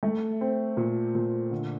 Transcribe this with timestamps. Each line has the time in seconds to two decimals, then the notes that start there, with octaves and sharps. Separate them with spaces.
0.03 A3
0.41 C4
0.77 A#2
1.15 A#2
1.51 D3